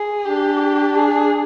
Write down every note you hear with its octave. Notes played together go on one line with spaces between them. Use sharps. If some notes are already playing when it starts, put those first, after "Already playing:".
Already playing: G#4
D4 G4
G#4